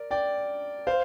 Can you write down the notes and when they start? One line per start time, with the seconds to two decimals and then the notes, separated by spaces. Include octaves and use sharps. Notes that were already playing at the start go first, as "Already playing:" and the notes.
Already playing: A#4 D5
0.11 D5 G5
0.87 C5 F5